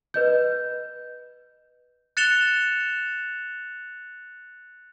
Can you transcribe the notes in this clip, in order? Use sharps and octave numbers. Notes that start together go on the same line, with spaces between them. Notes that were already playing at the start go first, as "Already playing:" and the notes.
B4 D#5 G6
F#6 A6 C#7 E7 F7 G7